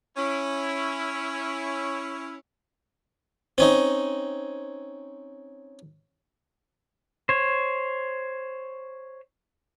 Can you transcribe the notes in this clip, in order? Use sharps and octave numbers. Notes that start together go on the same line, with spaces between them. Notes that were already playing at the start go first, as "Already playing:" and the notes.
C#4 E4
C4 C#4 D#4
C5 C#5